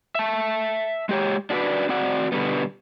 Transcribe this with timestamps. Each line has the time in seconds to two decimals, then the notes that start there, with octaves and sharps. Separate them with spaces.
0.15 E5 A5
1.09 G#3 G4 C#5
1.50 D4 F#4 G4 B4 D5
1.89 C4 F#4 D5 F#5
2.32 B2 D3 D#3 G3 B3